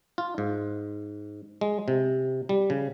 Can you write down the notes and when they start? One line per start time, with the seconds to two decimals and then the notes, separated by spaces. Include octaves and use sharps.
0.18 F4
0.38 G#2
1.61 G#3
1.88 C3
2.49 G3
2.70 C#3